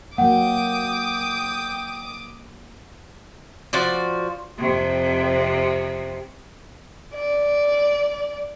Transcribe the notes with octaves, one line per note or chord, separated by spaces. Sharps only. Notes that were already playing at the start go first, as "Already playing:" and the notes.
F#3 A#3 F#5 G5 D6 D#6
F3 F#4 D5
F2 C3
D5